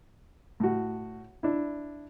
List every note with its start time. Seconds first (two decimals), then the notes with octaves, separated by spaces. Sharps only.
0.60 A2 F#4
1.43 D4 E4